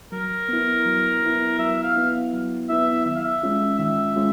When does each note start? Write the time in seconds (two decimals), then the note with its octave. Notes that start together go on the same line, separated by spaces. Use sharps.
0.12 F#3 A#4
0.49 B3 E4
0.86 F#3
1.22 B3 E4
1.59 F#3 E5
1.83 F5
1.96 B3 E4
2.33 F#3
2.69 B3 E4 E5
3.06 D#3 E5
3.16 F5
3.24 E5
3.43 G#3 C#4 F4
3.79 D#3 E5
4.16 G#3 C#4 F4